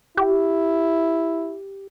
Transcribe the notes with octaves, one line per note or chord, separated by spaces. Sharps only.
E4 G4